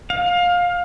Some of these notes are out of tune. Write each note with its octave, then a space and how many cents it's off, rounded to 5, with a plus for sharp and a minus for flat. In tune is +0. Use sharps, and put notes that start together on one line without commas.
F5 +20